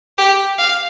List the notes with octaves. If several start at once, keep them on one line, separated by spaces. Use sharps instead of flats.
G4
F5